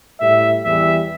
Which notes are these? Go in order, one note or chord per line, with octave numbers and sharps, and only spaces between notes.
A2 G3 E5
E2 E3 G3 E5